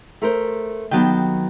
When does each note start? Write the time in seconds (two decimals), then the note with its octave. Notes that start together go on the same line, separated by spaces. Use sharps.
0.22 A3 A#4 C5
0.91 D#3 F#3 B3 G5